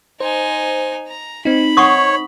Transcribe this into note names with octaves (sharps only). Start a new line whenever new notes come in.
D#4 C5 G#5
A#5
C4 D#4 B5
C#5 F#5 C#6 D#6